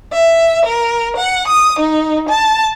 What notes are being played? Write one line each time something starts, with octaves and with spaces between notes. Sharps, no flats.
E5
A#4
F#5
D#6
D#4
A5